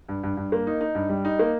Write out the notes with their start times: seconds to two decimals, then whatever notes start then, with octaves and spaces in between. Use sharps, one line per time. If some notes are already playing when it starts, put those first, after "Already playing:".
0.09 G2
0.23 G2
0.37 G2
0.52 A#3
0.67 D#4
0.81 D#4
0.95 G2
1.09 G3
1.25 D#4
1.39 A#3